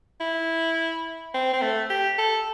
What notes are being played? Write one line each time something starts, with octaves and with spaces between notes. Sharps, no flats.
E4
C4
C4
A3
G4
A4